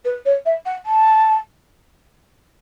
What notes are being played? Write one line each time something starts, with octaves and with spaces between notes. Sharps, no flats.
B4
C#5
E5
F#5
A5